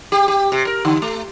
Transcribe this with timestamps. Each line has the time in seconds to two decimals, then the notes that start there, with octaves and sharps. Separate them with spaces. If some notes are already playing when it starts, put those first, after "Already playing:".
0.12 G4
0.28 G4
0.52 C3
0.67 A#4
0.85 D3
1.02 A3